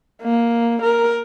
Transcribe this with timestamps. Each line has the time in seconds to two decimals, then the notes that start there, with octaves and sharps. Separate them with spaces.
0.22 A#3
0.82 A#4